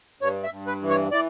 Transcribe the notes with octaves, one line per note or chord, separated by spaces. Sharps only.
G2 C#5
E5
G2
B4
E3
C#5
E3 D5